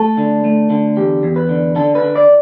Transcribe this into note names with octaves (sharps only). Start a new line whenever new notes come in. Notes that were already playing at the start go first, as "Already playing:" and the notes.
Already playing: A3 A4
D3
A3
D3
E2 G4
E2
B4
D3
D3 A4
B4
D3
D5